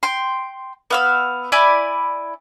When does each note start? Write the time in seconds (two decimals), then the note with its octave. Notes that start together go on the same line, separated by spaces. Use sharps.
0.03 G5 C6
0.90 B3 F5 E6
1.52 E4 D5 G#5 B5